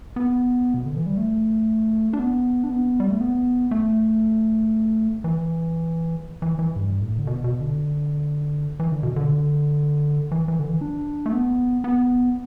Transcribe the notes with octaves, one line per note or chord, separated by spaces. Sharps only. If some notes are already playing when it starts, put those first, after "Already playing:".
B3
B2
D3
E3
G3
A3
D4
B3
D4
B3
G3
A3
B3
A3
E3
E3
E3
G2
A2
D3
B2
B2
D3
E3
D3
B2
D3
E3
E3
D3
E3
D4
A3
B3
B3